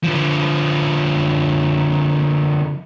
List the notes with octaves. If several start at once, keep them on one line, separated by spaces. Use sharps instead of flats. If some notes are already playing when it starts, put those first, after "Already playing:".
D3 F3